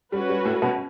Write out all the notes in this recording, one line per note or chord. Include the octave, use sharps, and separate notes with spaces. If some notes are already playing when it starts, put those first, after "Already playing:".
G3 C#4 F#4 B4
G3
A2 A3
B2 B3